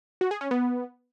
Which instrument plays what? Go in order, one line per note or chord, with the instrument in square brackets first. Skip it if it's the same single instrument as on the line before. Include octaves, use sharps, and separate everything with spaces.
[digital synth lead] F#4
G#4
C#4
B3